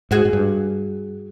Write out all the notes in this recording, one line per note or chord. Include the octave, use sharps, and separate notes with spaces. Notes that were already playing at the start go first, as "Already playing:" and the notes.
G#2 F#4 G#4
G#2
G2